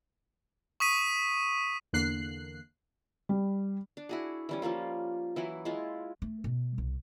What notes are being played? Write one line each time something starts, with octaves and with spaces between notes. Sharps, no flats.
C#6 D#6 B6 D#7
E2 D3 A#3 F#6 C7
G3
D4
E4 F#4 G#4
E3 G3 C#4
F3 G3 A#3 F4
E3 F#3 E4
G#3 E4 F4
A3
B2
C2